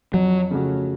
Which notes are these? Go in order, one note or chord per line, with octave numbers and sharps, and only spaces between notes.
F2 F#3
C#3 A3 C#4 F#4